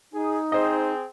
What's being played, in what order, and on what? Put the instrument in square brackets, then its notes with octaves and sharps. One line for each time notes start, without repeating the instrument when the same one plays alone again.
[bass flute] D#4 [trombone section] G#4
[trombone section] C4 G#4 [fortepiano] C5 D#5